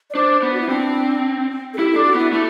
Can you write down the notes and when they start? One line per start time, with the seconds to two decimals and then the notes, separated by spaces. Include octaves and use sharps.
0.10 D5
0.15 D4 C5
0.43 B3
0.53 F#4
0.61 E4
0.69 C4 D4
1.74 A4
1.78 E4 G4
1.92 D4 A4
2.05 F#4
2.15 B3 E4
2.32 A3 E4